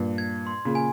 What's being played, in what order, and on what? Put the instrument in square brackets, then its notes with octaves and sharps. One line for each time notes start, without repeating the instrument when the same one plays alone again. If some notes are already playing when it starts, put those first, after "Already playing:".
Already playing: [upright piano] G2 A#2
[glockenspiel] G#6
C6
[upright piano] A#2 C#3
[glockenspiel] G#5